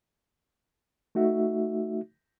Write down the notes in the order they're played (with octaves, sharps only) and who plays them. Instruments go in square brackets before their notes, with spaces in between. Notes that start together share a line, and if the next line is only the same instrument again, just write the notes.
[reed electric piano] A3 D#4 F#4 E5